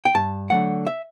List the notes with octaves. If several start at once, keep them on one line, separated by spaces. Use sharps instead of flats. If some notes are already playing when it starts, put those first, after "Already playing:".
G5
G2 A5
D3 F#3 A3 F#5
E5